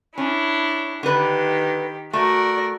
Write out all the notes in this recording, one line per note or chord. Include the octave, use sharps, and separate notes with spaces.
C#4 D4 E4
D3 D#3 G4 B4
A3 F#4 A#4 D5